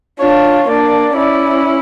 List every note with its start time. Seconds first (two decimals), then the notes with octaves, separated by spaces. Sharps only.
0.20 D4 F4 C#5
0.69 A#3 D4 D5
1.17 C#4 E4 D5